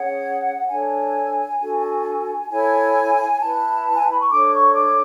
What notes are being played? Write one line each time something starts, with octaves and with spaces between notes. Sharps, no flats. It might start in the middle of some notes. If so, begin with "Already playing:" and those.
Already playing: C#4 G#4 C#5 F#5
D4 A4 C#5 G#5
D4 F#4 A4
E4 A4 C#5 G#5
E4 B4 A5
G#5
A5
B5
C#6
D4 A4 C#5 D6
C#6
D6